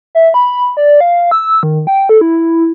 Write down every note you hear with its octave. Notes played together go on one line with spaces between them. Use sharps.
E5
B5
D5
F5
E6
D#3
G5
A4
E4